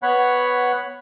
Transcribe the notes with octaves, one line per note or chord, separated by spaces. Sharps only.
B3 C#5 F#5 B5